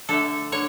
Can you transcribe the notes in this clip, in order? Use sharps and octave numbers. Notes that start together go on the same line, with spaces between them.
D3 A3 A4
D3 C#5